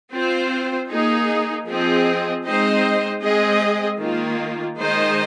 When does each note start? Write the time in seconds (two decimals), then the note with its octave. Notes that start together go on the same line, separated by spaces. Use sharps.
0.13 C4 F4 C5
0.90 A#3 D#4 G#4
1.68 F3 C4 G#4 D#5
2.45 G#3 C4 D#4 C5 D#5
3.23 G#3 C4 G#4 D#5
4.00 D#3 A#3 F4
4.78 D#3 G#3 D#4 C5 D#5